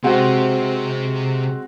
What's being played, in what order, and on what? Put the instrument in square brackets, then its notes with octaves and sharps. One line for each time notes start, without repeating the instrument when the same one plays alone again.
[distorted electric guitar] C3 [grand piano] G#3 C4 F#4